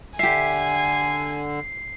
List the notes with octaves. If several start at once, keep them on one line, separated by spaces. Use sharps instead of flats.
D3 G4 E5 G#5 C7